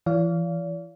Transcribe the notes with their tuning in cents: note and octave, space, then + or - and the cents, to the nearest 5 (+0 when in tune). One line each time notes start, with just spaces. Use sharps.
E3 +40 D5 -40 F5 -10